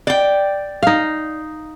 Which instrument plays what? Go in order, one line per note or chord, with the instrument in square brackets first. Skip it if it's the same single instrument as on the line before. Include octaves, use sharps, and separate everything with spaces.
[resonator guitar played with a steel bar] D5 G5
[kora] D#4 F5